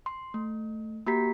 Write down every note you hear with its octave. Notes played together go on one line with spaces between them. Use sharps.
C6
A3
A#3 F#4 G4 A#5 B6